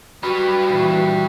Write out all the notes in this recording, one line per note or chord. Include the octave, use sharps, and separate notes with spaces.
G3 F#4 B4
A#2 E3